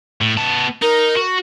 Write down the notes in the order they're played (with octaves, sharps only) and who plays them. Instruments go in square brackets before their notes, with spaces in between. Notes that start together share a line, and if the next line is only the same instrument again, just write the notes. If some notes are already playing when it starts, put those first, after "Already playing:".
[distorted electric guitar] A2
B3 A5
[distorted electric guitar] D#4 [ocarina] A#4
[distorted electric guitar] F#4